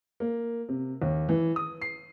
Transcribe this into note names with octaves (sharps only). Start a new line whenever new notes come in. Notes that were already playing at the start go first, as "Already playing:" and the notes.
A#3
C3
D#2
E3
D#6
C7